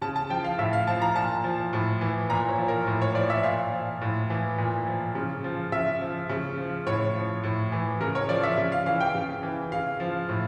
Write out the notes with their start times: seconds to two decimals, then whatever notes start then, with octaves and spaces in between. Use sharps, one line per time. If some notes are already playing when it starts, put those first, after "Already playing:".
0.02 C#3 A5
0.16 A5
0.30 F3 G5
0.44 F5
0.58 A2 E5
0.73 F5
0.87 F3 A5
1.02 A#5
1.16 A#2 A5
1.44 F3
1.73 A2
2.01 E3
2.30 A#2 A#5
2.49 C#5
2.58 F3
2.68 A#4
2.87 A2
3.02 C#5
3.15 F3 D5
3.30 E5
3.43 A#2 F5
3.72 F3
4.01 A2
4.30 E3
4.58 A#2
4.87 F3
5.15 C#3
5.44 F3
5.72 C#3 E5
6.01 F3
6.29 C#3
6.58 F3
6.87 A2 C#5
7.14 F3
7.43 A2
7.72 E3
8.01 C#3 A#4
8.15 C#5
8.29 F3 D5
8.43 E5
8.58 C#3
8.72 F5
8.86 E3 F5
9.00 G5
9.15 C#3
9.43 E3
9.72 C#3 F5
10.00 F3
10.29 A2